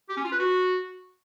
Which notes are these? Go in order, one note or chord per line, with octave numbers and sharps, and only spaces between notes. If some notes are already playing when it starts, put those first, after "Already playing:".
G4
C#4
F4
B4
F#4